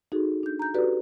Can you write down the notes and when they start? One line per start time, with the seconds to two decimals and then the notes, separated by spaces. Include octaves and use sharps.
0.12 D#4 F#4 G#4 A4
0.43 D4 G6
0.59 A#5 G6
0.74 F#4 G4 A4 B4 D5